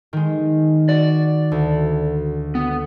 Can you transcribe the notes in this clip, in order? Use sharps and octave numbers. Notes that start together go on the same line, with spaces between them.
D#3 G#3
F#4 D5
D2
B3